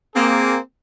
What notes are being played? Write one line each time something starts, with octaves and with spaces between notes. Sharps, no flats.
A#3 C4 G#4